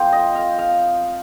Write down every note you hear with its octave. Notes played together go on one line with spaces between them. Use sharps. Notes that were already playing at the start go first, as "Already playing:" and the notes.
Already playing: F3 C4 C5
D#5
F5
F5